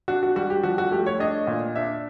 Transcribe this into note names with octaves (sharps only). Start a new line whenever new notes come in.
D4 F#4
F#4
G3 F#4
G4
F3 F#4
F#4
A3 G4
C#5
D4 D#5
A#2
D4 E5